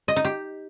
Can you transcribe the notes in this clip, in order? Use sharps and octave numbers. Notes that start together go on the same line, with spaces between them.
D#5
D#4
G4